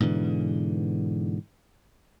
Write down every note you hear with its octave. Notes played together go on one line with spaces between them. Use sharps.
G#2 B2 D3 E3